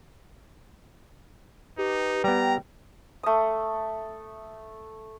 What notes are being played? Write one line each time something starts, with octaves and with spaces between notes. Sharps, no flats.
D#4 G4 B4
G3 B3 G5 A#5
A3 D#6